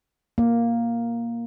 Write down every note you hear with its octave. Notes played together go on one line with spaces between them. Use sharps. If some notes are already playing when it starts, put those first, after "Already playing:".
A#3